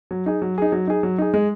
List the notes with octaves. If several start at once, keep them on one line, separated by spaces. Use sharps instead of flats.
F#3
D#4 G#4
F#3
D#4 G#4
F#3
D#4 G#4
F#3
D#4 G#4
G#3